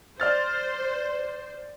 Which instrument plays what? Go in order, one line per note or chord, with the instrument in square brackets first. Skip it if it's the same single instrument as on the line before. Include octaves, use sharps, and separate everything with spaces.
[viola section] C5 [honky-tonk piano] D5 F6 A6